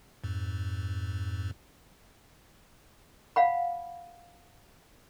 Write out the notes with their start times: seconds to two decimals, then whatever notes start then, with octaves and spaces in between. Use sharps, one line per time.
0.24 F2 G#2
3.36 F5 F#5 B5